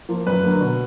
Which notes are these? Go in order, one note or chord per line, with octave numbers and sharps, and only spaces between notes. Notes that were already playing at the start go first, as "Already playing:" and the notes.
F3 A#3
F#2 B4
D3 F#3 A#3
B2